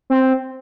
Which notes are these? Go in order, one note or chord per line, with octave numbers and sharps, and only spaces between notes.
C4